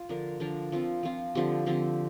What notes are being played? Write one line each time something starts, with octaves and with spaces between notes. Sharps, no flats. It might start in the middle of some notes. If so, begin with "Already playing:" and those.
Already playing: F4
D3 F3 D4 A#4
D3 F3 D4 A#4
F3 C4 F4
F3 C4 F4
D3 F3 C4 G4
D3 F3 C4 G4